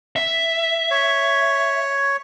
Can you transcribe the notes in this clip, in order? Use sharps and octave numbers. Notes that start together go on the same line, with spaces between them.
E5
C#5